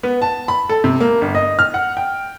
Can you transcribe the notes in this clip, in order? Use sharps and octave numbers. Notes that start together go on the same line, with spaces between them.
B3
A5
B5
A4
C3
A#3
G1
D#5
F6
F#5
G5